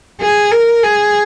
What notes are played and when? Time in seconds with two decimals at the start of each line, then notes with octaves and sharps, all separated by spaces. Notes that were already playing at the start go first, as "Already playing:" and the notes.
0.21 G#4
0.52 A#4
0.83 G#4